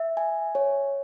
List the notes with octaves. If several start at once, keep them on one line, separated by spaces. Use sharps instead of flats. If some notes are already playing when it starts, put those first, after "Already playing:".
Already playing: E5
G#5
C#5